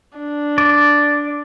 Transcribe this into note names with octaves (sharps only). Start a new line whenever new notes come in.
D4
D5